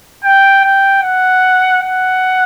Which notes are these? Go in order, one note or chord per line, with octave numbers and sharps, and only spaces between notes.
G5
G5
F#5
F#5